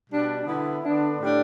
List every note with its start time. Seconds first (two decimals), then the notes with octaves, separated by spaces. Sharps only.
0.09 B2 G3 D4
0.46 D3 B3 E4
0.83 D3 B3 D4
1.20 A2 G3 D4